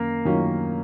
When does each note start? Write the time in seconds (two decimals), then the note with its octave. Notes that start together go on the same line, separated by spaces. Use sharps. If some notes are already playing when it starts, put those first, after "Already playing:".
Already playing: F#2 D#3 A#3
0.25 F#2 D#3 F#3 C#4 F4